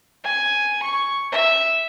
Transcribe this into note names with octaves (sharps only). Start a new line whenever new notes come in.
G#5
C#6
E5